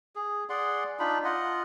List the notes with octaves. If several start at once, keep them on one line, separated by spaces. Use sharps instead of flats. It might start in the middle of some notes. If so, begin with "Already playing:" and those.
G#4
G#4 D5 F#5 C6
D4 D#4 F4 B5
F4 D#5 F#5